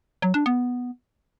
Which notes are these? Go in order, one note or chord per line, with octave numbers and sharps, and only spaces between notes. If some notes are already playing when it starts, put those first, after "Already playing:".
F#3
D4
B3